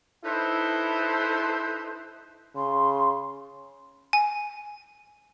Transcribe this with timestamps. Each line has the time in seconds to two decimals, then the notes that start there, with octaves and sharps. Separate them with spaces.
0.25 D#4 E4 A4 B4 C5
2.56 C#3 C6
4.13 G#5